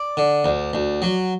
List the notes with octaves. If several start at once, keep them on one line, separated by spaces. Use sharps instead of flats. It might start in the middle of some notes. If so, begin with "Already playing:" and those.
Already playing: D5
D3
D2
D2
F#3